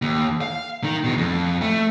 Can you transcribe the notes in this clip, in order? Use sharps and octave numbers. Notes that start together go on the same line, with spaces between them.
D#2
F5
D#3
B2 G#3
F2
A3